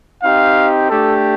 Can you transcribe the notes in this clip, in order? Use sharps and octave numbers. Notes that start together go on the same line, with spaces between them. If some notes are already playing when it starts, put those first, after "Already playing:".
C4 D#4 G4 F5
A3 D4 G4 A4